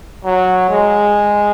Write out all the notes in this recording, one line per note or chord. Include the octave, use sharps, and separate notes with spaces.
F#3
G#3